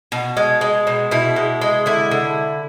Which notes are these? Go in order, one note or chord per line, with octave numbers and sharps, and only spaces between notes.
B2
G#3
G#3
B2
B2 E4
G#3
G#3
D3 E4
D3